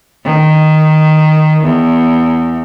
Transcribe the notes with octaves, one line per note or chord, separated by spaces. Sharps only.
D#3
E2